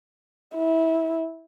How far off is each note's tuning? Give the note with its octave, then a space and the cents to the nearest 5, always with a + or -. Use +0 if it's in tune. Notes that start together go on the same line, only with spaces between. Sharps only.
E4 -20